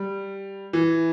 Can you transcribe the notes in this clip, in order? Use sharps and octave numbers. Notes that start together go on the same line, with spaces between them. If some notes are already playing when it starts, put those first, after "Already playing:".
Already playing: G3
E3